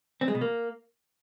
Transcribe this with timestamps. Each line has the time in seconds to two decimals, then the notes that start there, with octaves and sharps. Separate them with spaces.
0.21 C4
0.28 G#3
0.35 B2
0.41 A#3